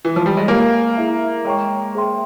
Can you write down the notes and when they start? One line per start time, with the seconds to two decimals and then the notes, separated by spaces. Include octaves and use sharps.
0.05 E3
0.16 F3
0.26 G3
0.37 G#3
0.48 A#3 G4 A#4 F5 G#5
0.97 E4 G#4 E5 A#5
1.45 G#3 C#5 G5 A#5 C#6
1.95 G#4 C5 E5 G5 C6